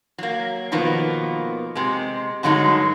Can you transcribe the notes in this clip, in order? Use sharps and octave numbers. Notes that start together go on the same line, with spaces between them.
F#3 A#3
B2 D#3 F3 A#3 B3
C3 G#3
G2 D3 F#3 G#3 D#4